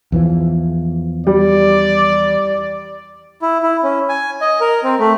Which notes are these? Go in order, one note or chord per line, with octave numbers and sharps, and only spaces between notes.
E2 E3 F3
G3 D5
E4
E4
C#4
G#5
D#5
A#4
C4
A3